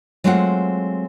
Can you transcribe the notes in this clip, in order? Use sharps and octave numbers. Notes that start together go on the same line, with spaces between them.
F#3 G#3 A3 C4 F4 F#5